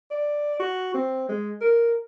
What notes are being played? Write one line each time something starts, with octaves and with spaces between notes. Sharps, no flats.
D5
F#4
C4
G#3
A#4